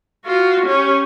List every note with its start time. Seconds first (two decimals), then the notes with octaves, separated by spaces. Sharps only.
0.25 F4 F#4
0.66 C#4 G4